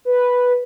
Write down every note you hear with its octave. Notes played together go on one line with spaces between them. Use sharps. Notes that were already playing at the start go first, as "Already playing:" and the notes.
B4